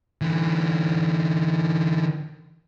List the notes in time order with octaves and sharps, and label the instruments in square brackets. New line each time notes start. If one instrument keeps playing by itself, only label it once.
[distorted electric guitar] D3 E3